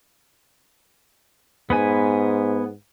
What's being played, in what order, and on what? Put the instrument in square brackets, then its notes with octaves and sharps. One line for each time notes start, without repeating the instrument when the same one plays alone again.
[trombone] G#2 [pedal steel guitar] B3 B4 G#5